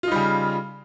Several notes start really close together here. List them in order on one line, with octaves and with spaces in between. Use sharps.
F4 D#4 G3 C#3